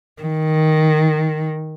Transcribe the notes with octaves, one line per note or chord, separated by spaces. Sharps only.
D#3